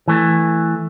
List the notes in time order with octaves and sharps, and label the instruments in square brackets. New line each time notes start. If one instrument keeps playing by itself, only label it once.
[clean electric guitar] E3 A3